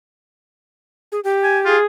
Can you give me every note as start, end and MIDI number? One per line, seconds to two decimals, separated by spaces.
1.12 1.20 68
1.24 1.76 67
1.43 1.59 80
1.65 1.78 65
1.65 1.86 68